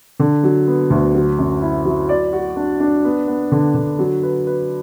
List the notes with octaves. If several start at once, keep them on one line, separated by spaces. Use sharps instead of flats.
D3
F#3
B3
D2
F#3
F#2
E4
F#3
D5
F#4
D4
D4
B3
B3
D3
D3
F#3
B4
B4